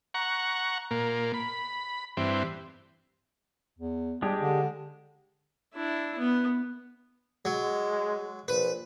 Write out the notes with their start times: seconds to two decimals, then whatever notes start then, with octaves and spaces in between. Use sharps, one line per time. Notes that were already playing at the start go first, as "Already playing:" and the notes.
0.14 F#5 A#5 C#6
0.91 A#2 A#3
1.34 B5
2.17 G2 E3 C4
3.79 E2
4.22 G3 G#3 D4 G4
4.41 D3
5.74 D4 E4
6.18 B3
7.45 F#3 G#3
8.48 A#1 B4